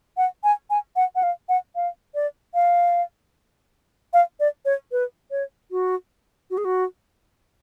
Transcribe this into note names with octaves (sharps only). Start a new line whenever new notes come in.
F#5
G#5
G#5
F#5
F#5
F5
F#5
F5
D5
F5
F5
D5
C#5
B4
C#5
F#4
F#4
G#4
F#4